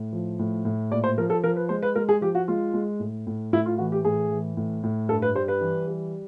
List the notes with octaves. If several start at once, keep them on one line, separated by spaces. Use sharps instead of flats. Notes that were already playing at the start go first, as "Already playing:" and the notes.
Already playing: A2
F3
A2
A2
A#2 D5
C5
F3 A#4
A4
F3 A#4
B4
G#3 C5
B4
G#3 A#4
G#4
F3 G4
F#4
G#3 F4
G#3
A2
A2
A2 E4
F4
E3 F#4
G4
A2 G#4
E3
A2
A2
G2 A4
B4
G3 C5
B4
E3
G3